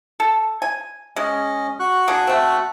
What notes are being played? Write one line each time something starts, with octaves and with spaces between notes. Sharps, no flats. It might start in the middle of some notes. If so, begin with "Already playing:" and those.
A4
G#5
G#3 C#4 D#5
F#4 C#6 F#6
A#3 D4 G#4
A3 C4